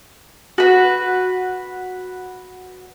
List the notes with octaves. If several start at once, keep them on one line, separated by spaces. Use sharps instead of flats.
F#4 B4